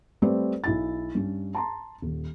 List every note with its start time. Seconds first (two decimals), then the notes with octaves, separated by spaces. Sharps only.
0.22 G3 A3 C4 G4 B4 D5
0.64 B1 E4 A6
1.15 G2 C#4
1.55 A5 A#5 C6
2.02 D#1